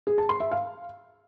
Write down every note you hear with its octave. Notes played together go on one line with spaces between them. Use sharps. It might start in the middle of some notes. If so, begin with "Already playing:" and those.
G#4
A5
C6
E5
F5